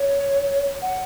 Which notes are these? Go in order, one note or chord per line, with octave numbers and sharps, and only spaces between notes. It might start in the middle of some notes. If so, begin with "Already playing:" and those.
Already playing: C#5
F#5